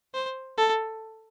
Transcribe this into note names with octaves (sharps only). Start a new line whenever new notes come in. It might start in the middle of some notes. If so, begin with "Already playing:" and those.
C5
A4